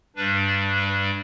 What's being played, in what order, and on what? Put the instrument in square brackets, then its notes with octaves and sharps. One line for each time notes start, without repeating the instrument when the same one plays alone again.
[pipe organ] G2 G3 D4 B4
D5
B4